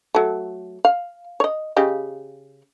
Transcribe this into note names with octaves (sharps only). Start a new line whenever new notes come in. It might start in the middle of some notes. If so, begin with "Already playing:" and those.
F#3 A3
F5
C#5 D#5
C#3 G4 D#5